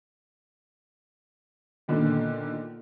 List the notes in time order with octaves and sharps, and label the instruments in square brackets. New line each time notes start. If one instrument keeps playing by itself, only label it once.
[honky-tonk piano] A#2 D3 D#3 B3